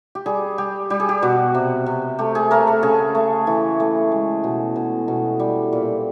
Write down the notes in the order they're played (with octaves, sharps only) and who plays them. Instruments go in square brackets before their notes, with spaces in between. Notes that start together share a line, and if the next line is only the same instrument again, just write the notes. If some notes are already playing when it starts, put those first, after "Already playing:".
[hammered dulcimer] G4
G3 G#4
G3 G4
G3 G4
G#4
G4
B2 F#4
C3
C3
A3 G4
G#4
A3 A#4
A4
C#3 G#4
A3
E3
A3
G#3
B2
B2
B2
G3
A#2